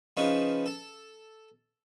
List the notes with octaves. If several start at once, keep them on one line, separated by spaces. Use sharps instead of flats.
C#3 F3 D#4 B4 F5 C#6
A4